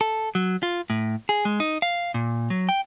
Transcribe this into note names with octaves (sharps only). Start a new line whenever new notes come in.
A4
F#3
F4
A2
G#4
G#3
D#4
F5
A#2
F#3
G5